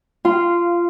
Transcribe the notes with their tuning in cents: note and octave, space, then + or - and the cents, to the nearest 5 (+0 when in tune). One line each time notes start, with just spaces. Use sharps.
F4 -15 F5 -5